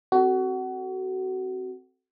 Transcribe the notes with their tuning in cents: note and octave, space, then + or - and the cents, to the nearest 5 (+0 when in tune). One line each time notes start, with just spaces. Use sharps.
C4 +0 F#4 +25 A4 +0